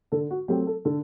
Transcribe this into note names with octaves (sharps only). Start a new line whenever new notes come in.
D3 A4
F#4
F#3 A3 C4 G4
A4
D3 A4